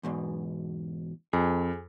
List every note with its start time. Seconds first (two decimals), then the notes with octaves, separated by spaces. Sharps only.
0.03 E2 G#2 B2
1.33 F2 G#4